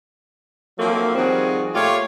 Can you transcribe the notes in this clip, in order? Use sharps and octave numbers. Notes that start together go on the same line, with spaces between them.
F3 F#3 A3 A#3 C4 D#4
D#3 F3 G3 C4 F#4 G#4
A#2 A3 F4 G4 C#5 F5